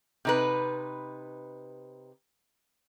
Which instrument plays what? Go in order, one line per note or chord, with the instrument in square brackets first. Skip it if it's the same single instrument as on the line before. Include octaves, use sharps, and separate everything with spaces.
[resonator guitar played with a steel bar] C3 D#4 B4